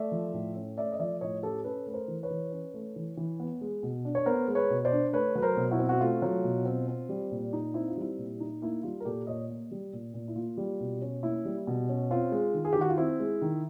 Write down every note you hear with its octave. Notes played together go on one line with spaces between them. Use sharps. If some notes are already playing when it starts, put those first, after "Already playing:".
Already playing: A3 D5 E5
F3
A2
C#4
A3 D5 E5
D#5
F3 D5 E5
A2 C#5 D#5
C#4 G4 A4
C#4 A4 B4
A3 B4
A#4 C5
E3
B4 C#5
E3
C#4
A3
E3
E3
B3
G#3
B2
D4
C#5
B3 A#4 C5
G#3
B4 C#5
B2
C5 D5
D4
A3 B4 C#5
F#3 B4
A#4 C5
B2
E4 F#4
C4
F#4
A3 F4
F#3
B2
C4
C4
G3
A#2
D#4
C4 E4
F4
G3 E4
A#2
D#4
A#3 E4
G3 F4
A#4
A#2 G4 A4
A#2 C#5 D#5
A#3
G3
A#2
A#2
E4
A#3 F4
G3
B2
C#4
A#3 E4
G3
B2
C#4
C4 F4
G#3
D#3
G#4
G4
D#3
F#4
F4
C4 E4
G#3
D#3